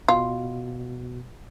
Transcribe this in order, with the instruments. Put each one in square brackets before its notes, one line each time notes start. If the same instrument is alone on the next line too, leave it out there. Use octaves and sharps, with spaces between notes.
[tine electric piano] B2 [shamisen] F4